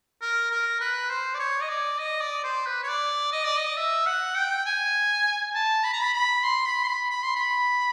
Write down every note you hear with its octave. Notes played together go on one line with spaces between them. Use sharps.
A#4
A#4
B4
C5
D5
C#5
D#5
D5
D#5
D5
C5
B4
C#5
D5
D#5
D5
D#5
E5
F#5
G5
G#5
A5
B5
A#5
B5
B5
C6
B5
C6
B5
B5
C6
B5